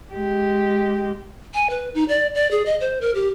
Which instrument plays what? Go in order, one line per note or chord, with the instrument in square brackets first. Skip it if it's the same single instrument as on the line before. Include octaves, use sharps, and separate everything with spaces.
[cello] G#3 G4
[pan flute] G#5
B4
D#4
D5
D5
G#4
D#5
C5
A#4
G4